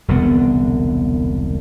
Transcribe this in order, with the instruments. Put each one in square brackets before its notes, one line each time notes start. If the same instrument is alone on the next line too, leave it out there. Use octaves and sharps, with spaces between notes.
[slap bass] E1 C2 D3 B3